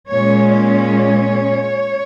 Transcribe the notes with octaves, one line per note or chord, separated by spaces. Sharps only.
A#2 G#3 C#4 C#5
C#5